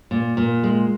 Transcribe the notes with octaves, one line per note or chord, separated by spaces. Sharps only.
A#2
A#2
G#3